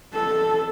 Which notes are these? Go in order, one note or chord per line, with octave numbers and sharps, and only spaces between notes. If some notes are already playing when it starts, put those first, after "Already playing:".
A4